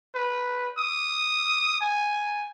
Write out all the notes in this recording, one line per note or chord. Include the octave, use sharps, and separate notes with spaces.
B4
D#6
G#5